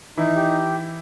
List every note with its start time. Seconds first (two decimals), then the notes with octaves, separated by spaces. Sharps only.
0.17 E3 D#4 E4
0.36 G4